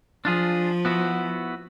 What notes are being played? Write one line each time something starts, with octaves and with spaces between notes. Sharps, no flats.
F3 D4 F4 G#4
B3 E4 F#4